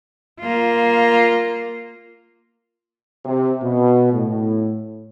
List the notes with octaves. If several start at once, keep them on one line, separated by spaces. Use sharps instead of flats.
A#3 F4
C3
B2
A2